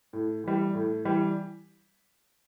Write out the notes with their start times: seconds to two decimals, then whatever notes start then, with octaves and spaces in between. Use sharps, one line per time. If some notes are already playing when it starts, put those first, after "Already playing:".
0.13 A2
0.44 E3 G3
0.75 A2
1.05 E3 G3